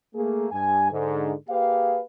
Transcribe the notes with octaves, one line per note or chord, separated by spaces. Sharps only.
A3 A#3 G#4
G2 G#5
G#2 D3
A#3 G4 G#4 B4 F5